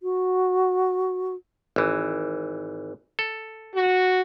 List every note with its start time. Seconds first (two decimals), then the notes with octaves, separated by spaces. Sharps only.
0.03 F#4
1.76 G#1 E3
3.19 A4
3.75 F#4